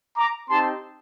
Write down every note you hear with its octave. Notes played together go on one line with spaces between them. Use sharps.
A#5 D6
C4 D#4 G4 A5 C6